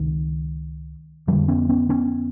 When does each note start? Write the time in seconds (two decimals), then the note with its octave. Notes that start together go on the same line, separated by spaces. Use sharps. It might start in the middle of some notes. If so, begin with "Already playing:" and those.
Already playing: C#2 C3 D#3
1.28 F2 D3 F3 G3
1.48 B3 C#4
1.69 B3 C#4
1.89 B3 C#4